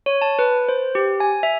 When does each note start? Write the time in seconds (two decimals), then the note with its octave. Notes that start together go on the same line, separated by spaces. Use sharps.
0.06 C#5
0.22 A5
0.39 B4
0.69 C5
0.95 G4
1.20 G#5
1.43 E5